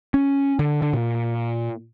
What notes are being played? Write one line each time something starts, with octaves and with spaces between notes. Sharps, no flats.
C#4
D3
D3
A#2